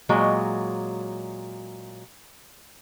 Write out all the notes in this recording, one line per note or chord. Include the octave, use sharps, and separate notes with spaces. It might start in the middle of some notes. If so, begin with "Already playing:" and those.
A#2 F#3 G#3